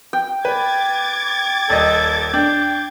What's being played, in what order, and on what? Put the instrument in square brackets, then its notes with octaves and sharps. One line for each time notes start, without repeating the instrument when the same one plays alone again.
[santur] G5
[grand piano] B4 [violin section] D6 G#6 A6
[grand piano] D#1 D#5 [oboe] A4
[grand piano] D4 [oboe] G5